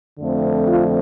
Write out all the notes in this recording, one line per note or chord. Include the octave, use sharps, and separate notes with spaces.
F2 D3 F3 A3 C4
F4